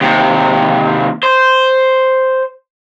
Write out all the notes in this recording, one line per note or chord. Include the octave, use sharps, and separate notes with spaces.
D#2 C3
C5